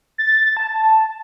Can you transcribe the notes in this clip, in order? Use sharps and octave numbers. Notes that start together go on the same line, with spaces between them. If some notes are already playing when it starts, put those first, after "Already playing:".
A6
A5